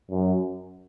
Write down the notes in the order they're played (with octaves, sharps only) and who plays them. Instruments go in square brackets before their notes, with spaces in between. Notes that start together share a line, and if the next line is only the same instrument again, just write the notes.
[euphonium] F#2